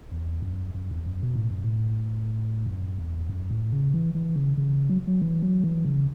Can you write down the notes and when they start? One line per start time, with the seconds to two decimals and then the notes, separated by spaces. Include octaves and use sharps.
0.11 E2
0.42 F#2
0.74 F#2
0.91 E2
1.06 F#2
1.23 B2
1.36 A2
1.50 F#2
1.64 A2
2.66 F#2
2.98 E2
3.30 F#2
3.51 A2
3.72 C#3
3.94 E3
4.15 E3
4.36 C#3
4.57 C#3
4.89 F#3
5.07 F#3
5.21 E3
5.42 F#3
5.64 E3
5.85 C#3